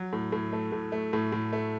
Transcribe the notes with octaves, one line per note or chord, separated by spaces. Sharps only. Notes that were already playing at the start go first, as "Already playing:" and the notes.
Already playing: F#3
A2
A2
A3
A2
A3
A2
A2
A3